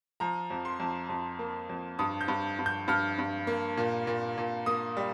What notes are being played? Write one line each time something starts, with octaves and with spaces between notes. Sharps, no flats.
F3 A#5
F2
C6
F2
F2
A#3
F2
G2 D#6
G6
G2
G2
G6
G2 F6
G2
A#3
A#2
A#2
A#2
A#3 D#6
G3